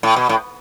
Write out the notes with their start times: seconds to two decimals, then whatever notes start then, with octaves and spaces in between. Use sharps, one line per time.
0.03 A2
0.16 B2
0.29 A2